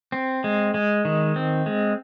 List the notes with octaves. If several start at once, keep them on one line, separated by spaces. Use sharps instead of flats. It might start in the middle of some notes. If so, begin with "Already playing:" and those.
C4
G#3
G#3
D#3
C4
G#3